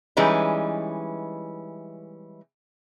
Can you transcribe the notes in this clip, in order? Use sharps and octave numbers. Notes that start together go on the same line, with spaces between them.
E3 G3 G#3 C#4 D#4 B4